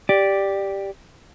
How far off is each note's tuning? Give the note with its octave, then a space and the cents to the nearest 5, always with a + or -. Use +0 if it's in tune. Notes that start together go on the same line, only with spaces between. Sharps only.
G4 +0 D5 +0